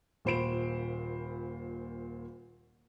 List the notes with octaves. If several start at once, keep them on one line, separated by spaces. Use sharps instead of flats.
D#1 A#2 C5 B5 D7 E7